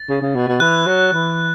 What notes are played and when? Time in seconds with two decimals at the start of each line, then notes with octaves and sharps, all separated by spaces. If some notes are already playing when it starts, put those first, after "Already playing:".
Already playing: A6
0.09 C#3
0.21 C#3
0.35 B2
0.48 B2
0.60 E3 F#6
0.86 F#3
1.13 E3